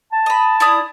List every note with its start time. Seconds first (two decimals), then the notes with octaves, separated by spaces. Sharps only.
0.13 A5
0.26 D#5 B5
0.60 E4 D5 D#6